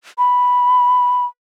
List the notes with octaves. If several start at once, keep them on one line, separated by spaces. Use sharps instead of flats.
B5